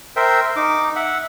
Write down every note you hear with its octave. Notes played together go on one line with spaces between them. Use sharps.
A#4 C5 E5 G5
D#4 D6
E5 F#5